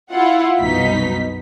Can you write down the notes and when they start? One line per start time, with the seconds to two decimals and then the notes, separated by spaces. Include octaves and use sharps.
0.11 E4 F4 F#5
0.60 C2 F#2 B2 D#4 B6